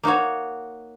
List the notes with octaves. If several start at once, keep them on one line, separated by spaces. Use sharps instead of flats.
A#3 D#4 F#4 C#5